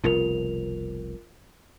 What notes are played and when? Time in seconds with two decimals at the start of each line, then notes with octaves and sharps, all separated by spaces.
0.04 F1 C2 B2 F4 A#4 F7